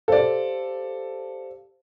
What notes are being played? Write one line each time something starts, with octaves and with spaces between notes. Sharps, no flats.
G4 A4 C5 D5 F5